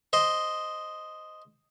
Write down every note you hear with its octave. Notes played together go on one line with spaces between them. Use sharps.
C5 D#5